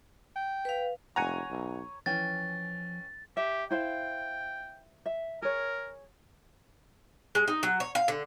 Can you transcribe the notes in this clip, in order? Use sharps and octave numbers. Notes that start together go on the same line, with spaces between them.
G5
B4 F5
F1 C#5 F#5 G#5 A#5 F#6 C#7
B1
E3 F3 C#4 G5 A6
G4 E5
E4 C5 F5 G5
E5
G#4 A#4 C#5
G#3
D#4
F#3
C#5
F5
D3